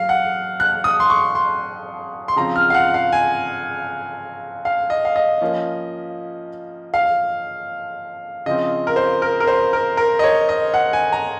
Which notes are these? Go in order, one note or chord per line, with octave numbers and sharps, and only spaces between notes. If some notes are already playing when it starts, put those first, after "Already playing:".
Already playing: F#3 F5
F#5
F#6
D#6
C6
C#6
C6
C6
C#3 F3 C4 F4 A#5
F6
F5
F#5
F5
G#5
F5
D#5
F5
D#5
F3 A#3 C#4 F4
F5
C#3 F3 C4 D#5
A#4
C5
A#4
A#4
C5
A#4
A#4
D#5
C#5
D#5
F#5
G#5
A#5